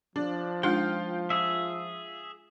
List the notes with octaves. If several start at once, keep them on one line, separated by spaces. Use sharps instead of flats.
F3 D4
G#3 D4 D#4 F4 G5
G#4 E5